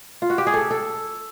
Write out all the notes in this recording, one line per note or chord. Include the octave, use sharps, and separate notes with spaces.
F4
F#4
G4
G#4
A4
A4